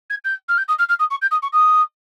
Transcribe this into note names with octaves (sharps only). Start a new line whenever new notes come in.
G#6
G6
F6
G6
D#6
F6
F6
D#6
C#6
G6
D#6
C#6
D#6